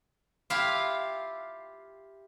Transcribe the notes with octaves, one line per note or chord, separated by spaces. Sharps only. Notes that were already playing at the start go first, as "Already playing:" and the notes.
E4 F4 G4 E5 F5